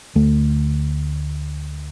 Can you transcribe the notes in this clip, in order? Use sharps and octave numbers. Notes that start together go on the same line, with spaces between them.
D2 A3